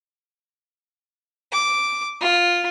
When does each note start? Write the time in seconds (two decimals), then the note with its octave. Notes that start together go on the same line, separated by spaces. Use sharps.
1.52 D6
2.21 F4